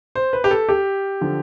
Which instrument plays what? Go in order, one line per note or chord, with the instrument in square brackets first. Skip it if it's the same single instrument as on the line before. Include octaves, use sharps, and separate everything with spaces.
[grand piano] C5
B4
G4
A4
G4
D3 F3